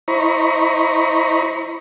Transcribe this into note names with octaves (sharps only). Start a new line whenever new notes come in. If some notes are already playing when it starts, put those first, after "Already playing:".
E4 C5 D#5 A#5 B5 C#6